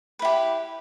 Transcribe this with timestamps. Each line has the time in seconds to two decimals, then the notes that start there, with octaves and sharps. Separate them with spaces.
0.19 B4
0.22 E4
0.25 G4